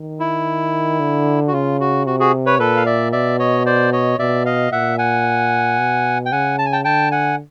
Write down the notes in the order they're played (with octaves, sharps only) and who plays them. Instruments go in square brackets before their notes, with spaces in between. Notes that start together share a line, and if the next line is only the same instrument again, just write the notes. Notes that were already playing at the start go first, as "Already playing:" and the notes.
Already playing: [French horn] D#3
[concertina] E4
[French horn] D3
[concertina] F#4
[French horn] C#3 [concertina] F4
[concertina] F#4
[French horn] C3 [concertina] F#4
[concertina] F#4 G#4
B4 C#5
[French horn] A#2 [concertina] A4 B4
[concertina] F5
D5 E5
[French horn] B2 [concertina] D5 E5
[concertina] C#5 D#5
C5 D5
C#5 D#5
[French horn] B2 [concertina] D5 E5
[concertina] D#5 F5
[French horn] A#2 [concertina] E5 F#5
[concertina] F#5 G#5
[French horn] B2
[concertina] G5
[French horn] C#3 [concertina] F#5 G#5
[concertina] A5
G#5
G5 A5
[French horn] D3 [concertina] G5 A5
[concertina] F#5 G#5